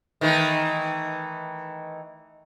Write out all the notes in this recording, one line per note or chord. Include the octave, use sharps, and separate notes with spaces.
D#3 E3 A3